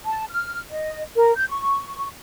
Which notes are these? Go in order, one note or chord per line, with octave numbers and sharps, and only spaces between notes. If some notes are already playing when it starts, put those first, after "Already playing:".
A5
F6
D#5
A#4
G6
C#6